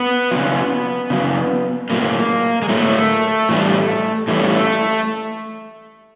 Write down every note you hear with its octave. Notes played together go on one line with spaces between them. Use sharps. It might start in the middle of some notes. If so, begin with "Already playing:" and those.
Already playing: B3
C#3 F#3
C#3 F#3
A2 F#3 A#3
G#3
A2 F#3 A3
A2 E3 G3
A2 E3 G3 A3